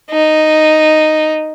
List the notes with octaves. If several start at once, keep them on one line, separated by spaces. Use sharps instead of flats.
D#4